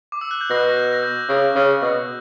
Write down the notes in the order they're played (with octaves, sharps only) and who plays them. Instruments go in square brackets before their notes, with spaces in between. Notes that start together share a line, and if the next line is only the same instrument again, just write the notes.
[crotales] D6
E6
F#6
G6
[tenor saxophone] B2 [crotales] A#6
[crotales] A#6
G6
A#6
G6
[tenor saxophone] C#3
C#3
B2